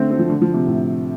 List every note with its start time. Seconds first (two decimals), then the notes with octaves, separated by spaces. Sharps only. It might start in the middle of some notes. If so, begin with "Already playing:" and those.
Already playing: D3 A3 C4
0.11 C4
0.19 F3
0.30 D3
0.42 F3
0.54 C3
0.66 A2